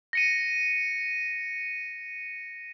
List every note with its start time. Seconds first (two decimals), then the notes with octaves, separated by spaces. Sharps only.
0.13 A#6 C#7 D#7